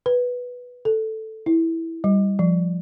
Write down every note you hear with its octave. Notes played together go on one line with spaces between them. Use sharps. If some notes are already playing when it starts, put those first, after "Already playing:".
B4
A4
E4
G3
F3